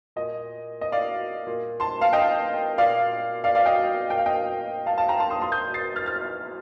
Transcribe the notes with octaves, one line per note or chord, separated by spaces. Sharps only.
A#2 D#5
D#5
D5 F5
A#2
A5 C6
F5 A5
D#5 G5
A#2 D5 F5
D5 F5
D5 F5
D#5 G5
A#2 G5
F5
D#5 G5
F5 A5
F5 A5
G5 A#5
A5 C6
C6 D#6
A#2 C6 D#6
D#6 G6
A6 C7
F6 A6
F6 A6